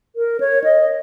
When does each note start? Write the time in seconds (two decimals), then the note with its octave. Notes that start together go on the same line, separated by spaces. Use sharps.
0.16 A#4
0.40 C#5
0.64 D#5